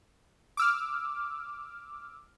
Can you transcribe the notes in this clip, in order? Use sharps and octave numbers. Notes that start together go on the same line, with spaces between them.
D6 E6 F6